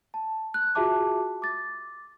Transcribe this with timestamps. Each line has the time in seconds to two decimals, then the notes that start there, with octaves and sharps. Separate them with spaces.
0.14 A5
0.54 F#6
0.75 F4 F#4 G#4 E5 A5 D6
1.42 D6 A6